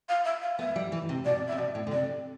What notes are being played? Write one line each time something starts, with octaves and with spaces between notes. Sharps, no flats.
F5
E5
F5
B3 E5
G3
E3
C3
B2 D5
C3 E5
B2 D5
A2
D3
C3 D5